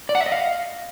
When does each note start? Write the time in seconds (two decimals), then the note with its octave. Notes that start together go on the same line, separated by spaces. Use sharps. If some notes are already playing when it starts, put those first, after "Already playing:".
0.09 D5
0.15 F#5
0.20 E5
0.26 D#5
0.32 F5